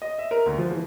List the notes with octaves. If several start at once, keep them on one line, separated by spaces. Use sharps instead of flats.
D#5
E5
A#4
D2
F3
E3